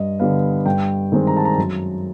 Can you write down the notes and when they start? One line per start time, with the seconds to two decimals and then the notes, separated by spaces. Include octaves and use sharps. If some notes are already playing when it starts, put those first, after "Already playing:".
Already playing: G2 D#5
0.19 D3 G3 B3 F5
0.65 G2 G5
1.12 D#3 G#3 C4
1.27 A#5
1.37 A5
1.45 A#5
1.58 F#2